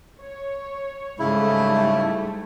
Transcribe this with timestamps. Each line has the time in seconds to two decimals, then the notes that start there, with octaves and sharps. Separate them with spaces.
0.21 C#5
1.19 G#2 C#3 G3 A3 E4